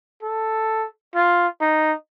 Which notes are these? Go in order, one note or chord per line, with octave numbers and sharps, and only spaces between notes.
A4
F4
D#4